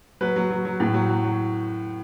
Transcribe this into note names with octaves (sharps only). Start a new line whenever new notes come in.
F#3 B4
F#3
F#3
F#3
A2
F#3
F#3
F#3